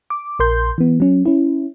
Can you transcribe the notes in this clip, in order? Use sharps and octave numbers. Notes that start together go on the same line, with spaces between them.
D6
A#1 A#4 C6 G6
E3 B3
F#3 C#4
C#4 E4